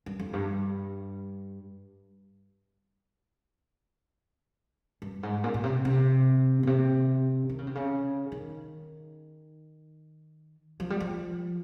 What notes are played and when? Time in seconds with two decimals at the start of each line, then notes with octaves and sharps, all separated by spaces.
0.06 G2
0.20 F2
0.33 G2
5.02 G2
5.23 G#2
5.44 A#2
5.54 A#2
5.63 C3
5.85 C3
6.63 A#2
6.67 C3
7.49 D#3
7.58 C#3
7.67 C3
7.75 C#3
8.32 D#3
10.80 F3
10.90 G3
11.00 F3